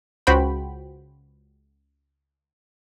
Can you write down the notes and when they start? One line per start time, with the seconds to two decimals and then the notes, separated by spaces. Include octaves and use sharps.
0.27 C#2 F#4 C5 G5 B5